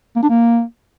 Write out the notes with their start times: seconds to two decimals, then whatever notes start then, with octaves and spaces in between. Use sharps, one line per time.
0.16 A#3
0.23 D4
0.30 A#3